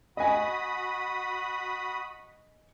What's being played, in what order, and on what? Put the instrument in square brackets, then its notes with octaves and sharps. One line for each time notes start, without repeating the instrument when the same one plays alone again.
[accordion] F#4 B5 D#6 [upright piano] D#5 G#5